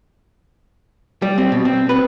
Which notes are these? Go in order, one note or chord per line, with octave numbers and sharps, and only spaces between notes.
G3
C4
B2
C4
B4